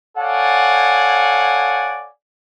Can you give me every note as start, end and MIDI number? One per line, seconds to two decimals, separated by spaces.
0.17 2.09 69
0.17 2.09 73
0.17 2.09 74
0.17 2.09 77
0.17 2.09 78
0.17 2.09 80